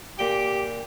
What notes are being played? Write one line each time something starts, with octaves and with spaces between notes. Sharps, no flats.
A#2 G4 G5